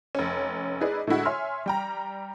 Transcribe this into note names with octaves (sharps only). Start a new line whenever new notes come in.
F1 C#4
D#4 E4 G#4 B4 D5
A2 D3 G#3 E4 F#4
C#5 E5 G#5 C6 F6
G3 G5 A#5